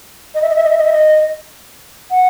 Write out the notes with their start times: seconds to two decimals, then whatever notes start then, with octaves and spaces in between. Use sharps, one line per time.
0.34 D#5
0.42 E5
0.49 D#5
0.56 E5
0.64 D#5
0.71 E5
0.78 D#5
0.86 E5
0.92 D#5
2.10 F#5